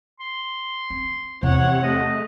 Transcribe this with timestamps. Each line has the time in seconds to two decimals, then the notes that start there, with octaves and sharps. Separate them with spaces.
0.20 C6
0.90 C4
1.43 E2 C3 C#5 F#5
1.83 A3 D#5